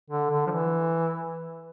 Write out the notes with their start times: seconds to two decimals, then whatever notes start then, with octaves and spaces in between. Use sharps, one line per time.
0.10 D3
0.31 D3
0.47 F3
0.50 E3